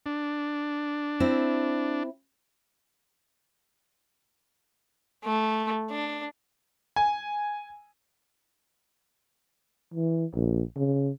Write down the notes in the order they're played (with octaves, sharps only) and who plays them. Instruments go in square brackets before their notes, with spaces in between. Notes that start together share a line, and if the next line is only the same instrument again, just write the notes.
[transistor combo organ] D4
[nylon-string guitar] C4 E4
[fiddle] A3
D4
[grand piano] G#5
[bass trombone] E3
A#1
C#3